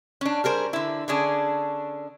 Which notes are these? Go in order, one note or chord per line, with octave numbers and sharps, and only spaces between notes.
C#4 D4
G3 G#4 A#4 C5
D3 E4
D3 C#4 D4 G#4